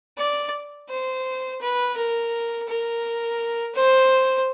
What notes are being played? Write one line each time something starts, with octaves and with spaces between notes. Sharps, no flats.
D5
C5
B4
A#4
A#4
C5